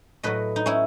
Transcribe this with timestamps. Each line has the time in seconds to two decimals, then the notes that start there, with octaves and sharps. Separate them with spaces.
0.23 A2 F#3 B4 D#5
0.56 D#4
0.66 C#4 E4